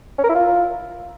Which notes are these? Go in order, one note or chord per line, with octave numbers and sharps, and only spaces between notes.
C#4
A#4
E4
F4